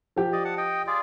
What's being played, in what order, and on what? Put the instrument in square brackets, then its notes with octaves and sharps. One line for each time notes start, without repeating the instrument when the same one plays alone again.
[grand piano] F3 G4
[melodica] D5 D#5
F#5 A5
D#5 G5
F4 G#4 D5